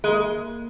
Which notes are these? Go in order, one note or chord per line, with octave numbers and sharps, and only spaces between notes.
G#3 A#3